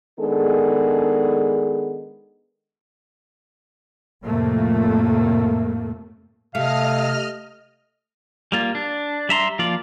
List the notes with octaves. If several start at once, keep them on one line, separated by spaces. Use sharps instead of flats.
D#3 G#3 B3 D4 G#4 A4
F2 A2 C3 A3 A#3
C3 A3 D#5 F5 F6
G3 A#3 F4
D4
G3 E5 A#5 C6
F3 A#3 F4 D5